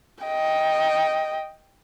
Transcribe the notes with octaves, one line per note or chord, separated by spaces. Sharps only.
D#5 G5